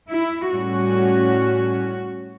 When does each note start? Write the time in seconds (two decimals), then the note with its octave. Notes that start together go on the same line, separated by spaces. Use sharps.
0.10 E4
0.49 A2 G3 C#4 F#4